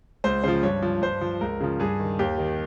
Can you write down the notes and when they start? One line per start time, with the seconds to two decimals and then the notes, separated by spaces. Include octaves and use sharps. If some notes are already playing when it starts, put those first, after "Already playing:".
0.24 C#2 C5
0.44 C#3 F3 C5
0.63 G2 C#5
0.82 F3
1.02 G2 C5
1.21 F3
1.41 C#2 A#4
1.60 C#3 F3
1.80 G2 G#4
1.99 D#3
2.19 D#2 G4
2.38 D#3